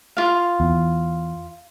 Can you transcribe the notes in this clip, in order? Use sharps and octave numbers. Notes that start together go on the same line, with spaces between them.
F4 F5
E2